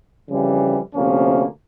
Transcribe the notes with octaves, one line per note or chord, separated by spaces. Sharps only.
F2 C#3 E3 G3
D2 C3 F3 A#3 C#4